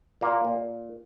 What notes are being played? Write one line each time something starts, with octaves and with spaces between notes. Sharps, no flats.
A#2 A#3
A#2